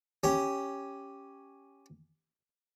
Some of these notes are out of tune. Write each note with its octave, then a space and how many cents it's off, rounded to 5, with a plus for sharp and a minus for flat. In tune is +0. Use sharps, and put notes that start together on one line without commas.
C#4 +0 G4 +0